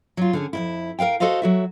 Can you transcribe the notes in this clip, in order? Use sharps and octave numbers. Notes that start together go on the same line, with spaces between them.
F#3 F4
D3 C#4 G#4
F2 G#2 E4
A#4 B4 F5 G5
F#4 A4 C5 D#5 F5
F#3 F#4 E5